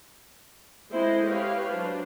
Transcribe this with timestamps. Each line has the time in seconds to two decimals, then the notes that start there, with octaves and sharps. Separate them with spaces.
0.90 G#3 C4 E4 A4 C5 D#5
1.26 G4 B4 C#5 F5
1.71 F#3 D4 C5